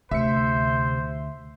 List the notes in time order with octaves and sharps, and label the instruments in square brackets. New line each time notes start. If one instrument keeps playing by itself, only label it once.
[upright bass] D2 [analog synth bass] C3 [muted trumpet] C5 [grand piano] E5 C#7